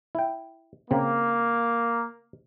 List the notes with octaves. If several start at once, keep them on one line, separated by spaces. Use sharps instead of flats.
E4 G5
C#3 A#3 C4